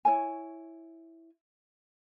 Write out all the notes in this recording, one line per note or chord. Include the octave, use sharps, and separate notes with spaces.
E4 C#5 G#5